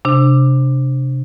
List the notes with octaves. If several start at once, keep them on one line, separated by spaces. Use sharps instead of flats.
C3 D4